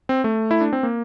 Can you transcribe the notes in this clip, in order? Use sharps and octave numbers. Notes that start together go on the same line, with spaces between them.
C4
A3
E4
D4
C4
A#3